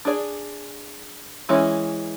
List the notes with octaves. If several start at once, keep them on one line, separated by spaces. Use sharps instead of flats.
D4 G#4 D5
E3 G#3 C#4 E4